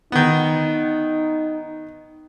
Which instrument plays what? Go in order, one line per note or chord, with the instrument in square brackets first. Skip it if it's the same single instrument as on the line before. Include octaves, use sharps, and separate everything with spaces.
[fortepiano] D#3 B3 [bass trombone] D#4